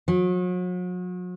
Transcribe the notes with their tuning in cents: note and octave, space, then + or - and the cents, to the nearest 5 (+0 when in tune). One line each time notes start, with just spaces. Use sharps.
F#3 -40